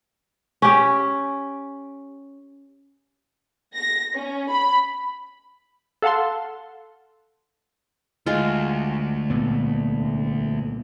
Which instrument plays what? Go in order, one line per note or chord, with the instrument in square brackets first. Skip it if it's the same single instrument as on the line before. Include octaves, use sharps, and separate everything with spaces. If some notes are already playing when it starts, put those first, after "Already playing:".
[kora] C#4 G4
[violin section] A#6
C#4
B5
[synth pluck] A4 F5 F#5 A5 C6
[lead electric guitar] D2 [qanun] G#3 F4
[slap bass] C2 A#2 B3